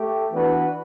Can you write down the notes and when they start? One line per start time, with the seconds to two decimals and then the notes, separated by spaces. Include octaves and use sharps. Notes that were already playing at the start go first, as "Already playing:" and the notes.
Already playing: A3 G4
0.33 E3 B3 D4 F#4 B4